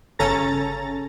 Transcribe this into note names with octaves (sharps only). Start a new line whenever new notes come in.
G1 C#3 C#4 A4 A#5 A6